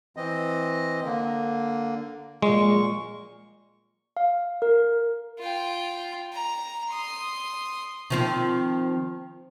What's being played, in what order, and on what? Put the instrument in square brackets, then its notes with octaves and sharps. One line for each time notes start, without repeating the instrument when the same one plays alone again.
[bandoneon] E3 C4 D#5
D3 A#3
[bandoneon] A#2 C#6 [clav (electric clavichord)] G#3
[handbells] F5
A#4
[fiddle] F4 G5
A#5
C6 D#6
[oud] D#3 F3 C4